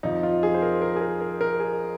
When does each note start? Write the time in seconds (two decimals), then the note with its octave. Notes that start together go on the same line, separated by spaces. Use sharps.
0.03 F2 F3 D#4
0.23 F4
0.43 G#4
0.54 C5
0.62 A#4
0.82 A#4
0.96 G#4
1.01 A#4
1.21 A#4
1.41 A#4
1.60 G#4